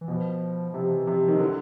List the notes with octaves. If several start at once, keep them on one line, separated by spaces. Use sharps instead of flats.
E3
B2 F3
C3 F3
E3
C3 F3
F3
D#3
D3 F#3